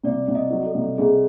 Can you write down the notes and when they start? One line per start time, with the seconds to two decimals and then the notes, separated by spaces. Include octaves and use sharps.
0.03 C2 D5
0.28 C2
0.35 D#5
0.50 F#3
0.66 A4
0.74 C2
0.98 C2 G#4